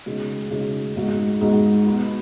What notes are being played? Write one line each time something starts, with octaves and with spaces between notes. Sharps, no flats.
C#3 G#3 D#4 F#4
C#3 G#3 D#4 F#4
G#2 G#3 D#4 F#4
G#2 G#3 D#4 F#4
B2 B3 F#4